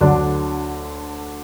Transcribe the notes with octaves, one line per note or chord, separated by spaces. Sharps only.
D2 D3 F#3 D4